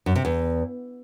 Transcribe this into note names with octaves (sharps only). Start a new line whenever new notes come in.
F#2
C3
E2